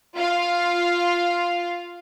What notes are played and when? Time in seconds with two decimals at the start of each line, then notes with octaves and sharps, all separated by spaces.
0.16 F4 F5